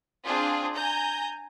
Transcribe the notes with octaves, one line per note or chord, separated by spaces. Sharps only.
C4 D4 F4 G#4
G#5 A#5 G6